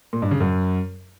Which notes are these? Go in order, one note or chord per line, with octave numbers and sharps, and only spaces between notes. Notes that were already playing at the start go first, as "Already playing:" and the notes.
A#2
G2
C#3
F#2